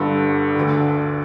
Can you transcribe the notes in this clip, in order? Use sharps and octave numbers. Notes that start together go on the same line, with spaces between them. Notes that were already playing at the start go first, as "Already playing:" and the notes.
Already playing: G1 G2 D3 A4
D2 D3